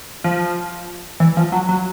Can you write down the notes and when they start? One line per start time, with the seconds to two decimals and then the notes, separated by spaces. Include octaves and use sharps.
0.24 F3
1.20 E3
1.37 F3
1.52 F#3
1.69 F#3